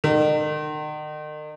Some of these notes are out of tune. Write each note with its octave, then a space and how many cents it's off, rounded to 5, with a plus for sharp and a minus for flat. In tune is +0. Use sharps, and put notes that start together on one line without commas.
D#3 -40